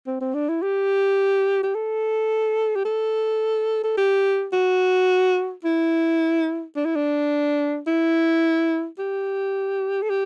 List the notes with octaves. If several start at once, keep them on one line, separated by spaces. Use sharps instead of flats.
C4
C4
D4
E4
G4
G4
A4
G4
A4
A4
G4
F#4
E4
D4
E4
D4
E4
G4
A4
G4